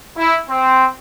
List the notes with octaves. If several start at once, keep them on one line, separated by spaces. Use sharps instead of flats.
E4
C4